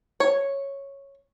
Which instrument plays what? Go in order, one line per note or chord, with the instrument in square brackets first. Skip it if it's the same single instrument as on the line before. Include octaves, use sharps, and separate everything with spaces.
[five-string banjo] C#5